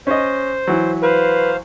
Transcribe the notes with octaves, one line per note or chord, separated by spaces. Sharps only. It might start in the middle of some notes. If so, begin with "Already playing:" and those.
C#4 C5 D#5
E3 F#3
B4 C5 F5